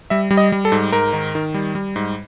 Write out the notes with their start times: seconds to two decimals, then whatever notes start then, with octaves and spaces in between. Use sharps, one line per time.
0.10 G3 E5
0.31 G3
0.37 D#5
0.52 G3
0.65 A4
0.72 G#2
0.92 G#2 A#4
1.13 D#3
1.35 D#3
1.54 G3
1.75 G3
1.96 G#2